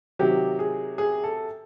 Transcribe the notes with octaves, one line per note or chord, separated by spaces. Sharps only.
C3 D#3 F#3 G4
G#4
G#4
A4